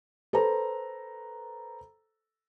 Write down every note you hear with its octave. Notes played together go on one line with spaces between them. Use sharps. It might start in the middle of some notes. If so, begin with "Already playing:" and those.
A4 B4 C5 A#5